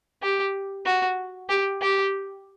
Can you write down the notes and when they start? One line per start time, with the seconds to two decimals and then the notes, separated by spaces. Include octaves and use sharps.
0.23 G4
0.86 F#4
1.50 G4
1.82 G4